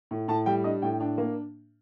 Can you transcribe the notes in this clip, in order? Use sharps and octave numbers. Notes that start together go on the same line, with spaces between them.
A2
A2 A5
G3 G5
D4 D#5
A2 G5
D4
A#3